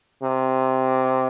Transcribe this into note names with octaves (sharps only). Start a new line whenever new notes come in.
C3